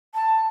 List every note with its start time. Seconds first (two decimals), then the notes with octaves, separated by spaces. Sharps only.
0.14 A5